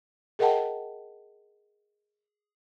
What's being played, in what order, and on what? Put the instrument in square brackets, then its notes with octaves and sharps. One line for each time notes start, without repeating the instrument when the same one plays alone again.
[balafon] G#4 A#4 D#5 F#5 G5 A5